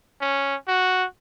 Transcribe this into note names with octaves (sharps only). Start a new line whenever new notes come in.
C#4
F#4